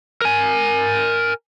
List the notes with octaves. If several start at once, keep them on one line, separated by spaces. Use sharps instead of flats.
A#4 G#5